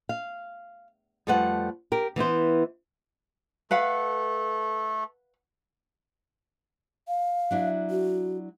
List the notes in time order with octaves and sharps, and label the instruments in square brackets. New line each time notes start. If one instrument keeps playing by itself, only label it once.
[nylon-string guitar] F5
F2 G3 A3 B4 C5 F#5
G4 A#4
E3 B3 E4 C5
[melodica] A3 A4 [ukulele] B4 F5 F#5
[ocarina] F5
[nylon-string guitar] F#3 D4 E4
[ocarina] F#4